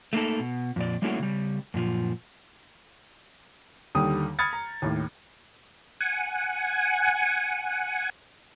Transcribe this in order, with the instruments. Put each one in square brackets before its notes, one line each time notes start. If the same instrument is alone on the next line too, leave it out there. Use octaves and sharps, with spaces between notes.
[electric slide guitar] A3 A#3 D#4 A4
B2
F2 A#2 D5
G3 A3 A#3 C#4 E4 F#4
C#3 G3
F#2 A#2 F3
[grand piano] D#2 D3 G3 G4 D#6
B5 D#6 F6 G#6 A6 C#7
A#5
D#2 A2
[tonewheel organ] F#5 G#5